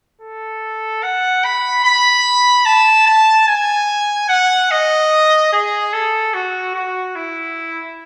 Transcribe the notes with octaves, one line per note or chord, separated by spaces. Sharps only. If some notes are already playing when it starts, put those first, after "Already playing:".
A4
F#5
B5
B5
A5
A5
G#5
F#5
D#5
G#4
A4
F#4
F#4
E4